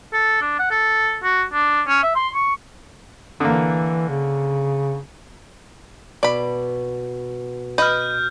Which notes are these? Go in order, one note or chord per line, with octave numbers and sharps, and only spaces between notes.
A4
D4
F#5
A4
F#4
D4
C#4
E5
C6
C#6
D3 E3 A#3
C#3
B2 D5 B5
B4 D#5 F6 G6